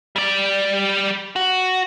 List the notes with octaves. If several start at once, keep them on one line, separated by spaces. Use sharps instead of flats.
G3 D5
F#4